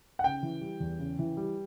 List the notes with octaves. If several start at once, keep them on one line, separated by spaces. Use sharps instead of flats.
F#5
C#3 G5
E3
G3
E2
C#3
E3
G3